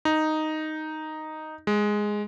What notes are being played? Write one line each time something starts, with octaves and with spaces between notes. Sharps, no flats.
D#4
G#3